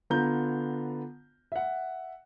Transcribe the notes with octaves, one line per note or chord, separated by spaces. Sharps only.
D3 B3 F4 A#5 G6
E5 F#5